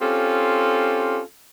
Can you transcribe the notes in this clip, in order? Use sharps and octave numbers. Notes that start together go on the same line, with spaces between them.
C4 C#4 F4 G4 A4